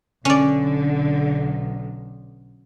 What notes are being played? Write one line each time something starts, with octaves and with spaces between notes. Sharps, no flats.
B1 D3 C#4 D5